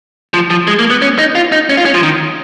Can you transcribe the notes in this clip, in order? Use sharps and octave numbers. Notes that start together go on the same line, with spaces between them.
F3
F3
G#3
A#3
B3
C#4
D#4
F4
D#4
C#4
F4
C#4
F3
D#3